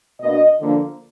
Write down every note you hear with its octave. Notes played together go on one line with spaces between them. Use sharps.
B2 A#3 D4 D#5
D3 F3 A#3